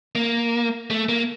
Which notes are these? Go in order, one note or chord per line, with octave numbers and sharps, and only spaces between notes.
A#3
A3
A#3